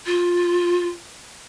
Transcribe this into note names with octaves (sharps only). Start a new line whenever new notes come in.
F4